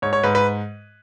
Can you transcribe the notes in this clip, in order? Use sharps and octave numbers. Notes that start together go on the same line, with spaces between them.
G#2 C#5
C#5
G#2 B4
B4